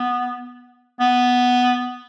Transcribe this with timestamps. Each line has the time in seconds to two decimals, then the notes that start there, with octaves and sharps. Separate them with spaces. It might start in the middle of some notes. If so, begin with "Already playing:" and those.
Already playing: B3
1.00 B3